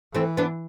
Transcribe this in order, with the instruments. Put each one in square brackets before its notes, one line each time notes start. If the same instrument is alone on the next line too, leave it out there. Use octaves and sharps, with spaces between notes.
[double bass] E3 [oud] A3 C4
[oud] B3 D4